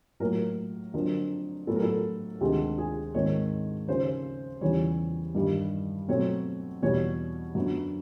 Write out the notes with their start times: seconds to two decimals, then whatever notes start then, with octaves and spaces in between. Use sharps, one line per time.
0.20 A2 F#3 A#3 A#4
0.94 F2 D3 F#3 A#4
1.67 A2 F#3 B3 A4
1.76 A#4
1.83 A4
2.41 D2 C3 D#3 G#3 G4
2.78 G#4
3.14 G#2 D#3 G#3 C4 C#5
3.87 D#2 C#3 F3 C5
4.61 E2 C#3 E3 G3 C#5
5.35 G2 D#3 G3
6.08 B2 F#3 A3 C4 C#5
6.82 E2 B2 G3 C#5
7.55 F#2 D3 F#3 B3